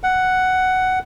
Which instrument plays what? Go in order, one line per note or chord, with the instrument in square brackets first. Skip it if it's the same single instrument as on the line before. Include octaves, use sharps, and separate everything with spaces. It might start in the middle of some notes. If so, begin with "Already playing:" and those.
[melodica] F#5